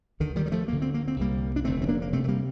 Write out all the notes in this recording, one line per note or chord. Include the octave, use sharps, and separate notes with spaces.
D2 D3 D#3
D#3 G3
G3
F3 A3
D2 D3 A#3
C4
A#3
C4
C2 C3 G3 A#3
D4
F1 D#2 D3 A3 C4
C4
A#3 D4
A#3
D2 C3 A3 C4
A3
G3 A#3